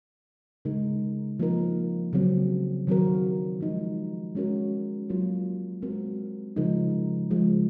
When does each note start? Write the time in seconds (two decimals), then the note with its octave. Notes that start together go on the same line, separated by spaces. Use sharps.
0.65 C#3 G#3 D#4 A#4
1.39 F3 A#3 D#4 A#4
2.13 C#3 F#3 C4 F#4
2.87 D#3 F#3 C4 F#4 A#4
3.61 F3 G#3 D#4
4.35 G#3 C#4 F#4 A#4
5.09 F#3 A#3 F4 A#4
5.82 G#3 C4 F#4 A#4
6.56 C#3 F3 G#3 D#4 A#4
7.31 C#3 F3 G#3